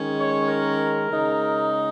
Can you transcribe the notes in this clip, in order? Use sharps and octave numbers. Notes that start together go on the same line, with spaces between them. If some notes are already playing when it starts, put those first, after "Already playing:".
Already playing: D#3 G#3 C#4
C#5
A#4
C#3 G#3 D#4